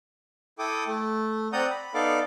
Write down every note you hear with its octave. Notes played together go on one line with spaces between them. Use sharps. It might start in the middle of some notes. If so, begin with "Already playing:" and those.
E4 A4 G5 D6 D#6
A3
C4 D5 F#5 A#5 D#6 G6
B5
B3 D#4 A4 D5 F5 D6